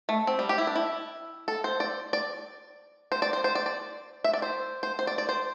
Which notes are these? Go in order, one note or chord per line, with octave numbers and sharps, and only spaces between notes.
A3
C4
G3
G4
E4
D4
E4
A4
C5
D5
D5
C5
D5
C5
C5
D5
D5
E5
D5
C5
C5
C5
D5
D5
C5